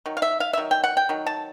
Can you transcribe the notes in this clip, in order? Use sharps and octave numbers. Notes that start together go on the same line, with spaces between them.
D#3 F#3
F5
E5
F5
E5
D#3 F#3
G5
F#5
G5
D#3 F#3
A5